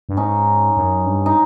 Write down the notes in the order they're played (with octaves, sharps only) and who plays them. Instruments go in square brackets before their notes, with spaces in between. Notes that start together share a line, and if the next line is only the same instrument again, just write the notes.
[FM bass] G2
[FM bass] G#2 [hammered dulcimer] C#4 D#4
[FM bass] F#2
G2
[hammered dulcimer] D#4